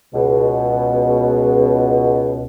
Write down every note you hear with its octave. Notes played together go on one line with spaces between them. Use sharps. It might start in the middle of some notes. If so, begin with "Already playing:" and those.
C#2 B2